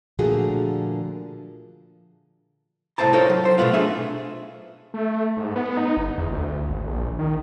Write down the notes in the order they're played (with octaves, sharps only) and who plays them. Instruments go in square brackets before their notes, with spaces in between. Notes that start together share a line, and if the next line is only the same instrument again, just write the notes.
[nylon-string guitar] A#2 D3 F3 A3 F#4 G#4
[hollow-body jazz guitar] C2 A2 E4 C5 A5 A#5
D#4 F4 A4 A#4 C5 C#5
F#3
C5
B2 D3 A3 B3 F4
A3 D4 D#4 G#4 E5
[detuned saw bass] A3
G#2
B3
D#4
G1
E2
D2
G#1
A#1
D#3